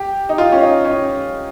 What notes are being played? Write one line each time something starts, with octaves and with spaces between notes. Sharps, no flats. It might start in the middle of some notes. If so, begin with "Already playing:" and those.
Already playing: G4
D#4
F4
C#4
D#4
C#4